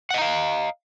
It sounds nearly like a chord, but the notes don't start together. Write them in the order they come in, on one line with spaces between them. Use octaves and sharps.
F#5 D#5 A#5 F5